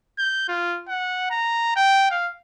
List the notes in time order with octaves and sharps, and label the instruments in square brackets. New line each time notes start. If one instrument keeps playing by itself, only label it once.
[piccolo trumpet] G6
F4
F#5
A#5
G5
F5